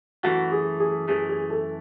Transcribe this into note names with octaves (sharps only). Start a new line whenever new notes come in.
F#2 E3 A3 F#4
G#4
G#4
F#2 E3 A3 G#4
G#4
A4